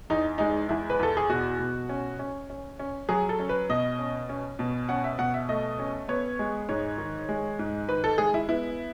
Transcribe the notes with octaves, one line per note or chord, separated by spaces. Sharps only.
E2 D#4
G#3 D#4
E2 E4
B4
E2 A4
G#4
B2 F#4
B2
C#4
C#4
C#4
C#4
F#3 G#4
A4
C#4
B4
B2 D#5
C#4
C#4
B2
C#4 F#5
E5
B2 F#5
E5
A3 D#5
C#4
B3 C#5
G#3
G#2 C#5
D#3
G#3
G#2
D#3 B4
A4
G#3 G#4
E4
B3 E4